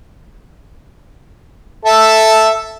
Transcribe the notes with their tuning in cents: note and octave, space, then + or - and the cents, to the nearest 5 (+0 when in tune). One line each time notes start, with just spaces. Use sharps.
A4 +0 E5 +0